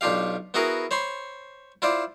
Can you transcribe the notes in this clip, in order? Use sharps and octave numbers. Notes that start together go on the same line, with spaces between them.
B1 D4 F4 G4 F5
B3 E4 F#4 G#4 A#4
C5 C#5 B5 C6
E4 F4 C5 D5